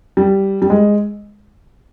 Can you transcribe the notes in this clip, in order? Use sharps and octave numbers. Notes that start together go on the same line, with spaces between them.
G3
G3
G#3